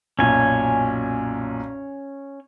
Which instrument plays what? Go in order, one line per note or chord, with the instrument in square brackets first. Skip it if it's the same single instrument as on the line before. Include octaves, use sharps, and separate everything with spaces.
[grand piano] B1 F#2 A#2 [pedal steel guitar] C#4 G#5